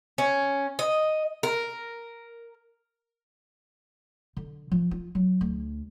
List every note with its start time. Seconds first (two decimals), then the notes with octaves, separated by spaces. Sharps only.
0.18 C#4
0.79 D#5
1.43 A#4
4.37 D3
4.71 F3
4.91 F4
5.15 F#3
5.41 D2